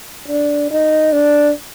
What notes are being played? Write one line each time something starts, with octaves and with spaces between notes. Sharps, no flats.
D4
D#4
D4